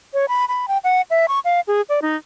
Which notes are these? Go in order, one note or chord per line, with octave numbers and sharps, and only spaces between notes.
C#5
B5
B5
G5
F#5
E5
C#6
F5
G#4
D5
D#4